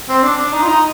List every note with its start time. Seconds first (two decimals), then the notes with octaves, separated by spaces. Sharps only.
0.09 C4
0.23 D4
0.39 D4
0.53 D#4
0.62 F4
0.68 D#4